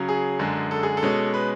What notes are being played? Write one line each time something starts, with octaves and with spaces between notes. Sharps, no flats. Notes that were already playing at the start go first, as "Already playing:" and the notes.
Already playing: C#3 F#3 C#4
G#4
F#2 D3 G#3
A4
G#4
A4
B2 G#3 C#4
B4